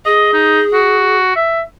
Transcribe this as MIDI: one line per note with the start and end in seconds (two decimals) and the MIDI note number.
0.06 1.18 68
0.06 0.29 75
0.34 0.61 63
0.73 1.34 66
1.36 1.61 76